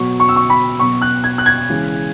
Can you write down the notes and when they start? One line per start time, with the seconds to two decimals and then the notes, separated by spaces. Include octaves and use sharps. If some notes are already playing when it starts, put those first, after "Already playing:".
Already playing: B2 F#3 B3 C#6
0.20 C#6
0.29 E6
0.36 C#6
0.50 B5
0.79 B2 F#3 B3 C#6
1.02 F#6
1.24 G#6
1.38 F#6
1.46 G#6
1.69 C#3 E3 G#3